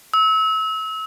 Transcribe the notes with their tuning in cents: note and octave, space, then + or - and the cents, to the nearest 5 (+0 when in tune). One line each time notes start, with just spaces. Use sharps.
E6 -30